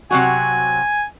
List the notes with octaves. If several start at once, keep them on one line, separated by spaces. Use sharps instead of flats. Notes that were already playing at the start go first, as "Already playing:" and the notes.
C3 F#3 F#4 G#5